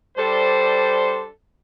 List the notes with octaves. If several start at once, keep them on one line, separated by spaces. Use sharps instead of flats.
G3 D4 A4 C5